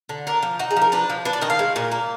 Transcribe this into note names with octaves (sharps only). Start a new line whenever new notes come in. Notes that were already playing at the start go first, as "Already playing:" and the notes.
D3
D4 A#4
F3
D#4 F#4
G#4
F3
A#4
D4 B4
F3
D4 B4
D5
D#3 D#5
F5
G#3
A#2
A#3